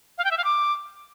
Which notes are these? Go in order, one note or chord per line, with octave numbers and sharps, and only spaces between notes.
F5
G5
E5
F5
D6